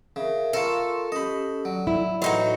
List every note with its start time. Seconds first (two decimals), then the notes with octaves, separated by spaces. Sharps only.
0.16 C#3 A#4 E5
0.53 F4 A4 A#4 F5 C6 C#6
1.12 C#4 G4 D#5 B5
1.65 F#3 D5
1.87 E4
2.22 A1 F#3 D#4 F#4 A4 C6